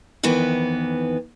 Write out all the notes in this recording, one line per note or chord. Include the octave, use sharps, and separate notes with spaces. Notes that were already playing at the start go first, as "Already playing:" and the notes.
F2 D#3 E3 B3